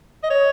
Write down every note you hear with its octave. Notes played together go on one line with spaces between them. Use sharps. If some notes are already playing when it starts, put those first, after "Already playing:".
D#5
C#5